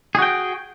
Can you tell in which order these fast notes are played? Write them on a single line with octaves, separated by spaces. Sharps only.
G#4 F#4 G5